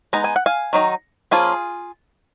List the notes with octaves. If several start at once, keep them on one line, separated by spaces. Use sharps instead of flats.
G#3 B3 D#4 A#5
G#5
F#5
F5 G#5
D#3 F#3 D#4
F3 A#3 C#4 F4 G#4